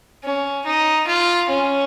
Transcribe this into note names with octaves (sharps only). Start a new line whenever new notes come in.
C#4
D#4
F4
C#4